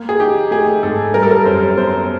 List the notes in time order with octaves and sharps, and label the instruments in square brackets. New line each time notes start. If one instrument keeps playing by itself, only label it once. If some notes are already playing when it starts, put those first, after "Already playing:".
Already playing: [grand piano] A#3
[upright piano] G#4
[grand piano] D#4 [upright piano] G4
[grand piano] A3 [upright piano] G#4
[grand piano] G#2 [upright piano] A4
[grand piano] G3 [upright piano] A#4
[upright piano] A4
A#4
[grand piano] F#2 [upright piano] C5
[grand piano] B3 [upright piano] C5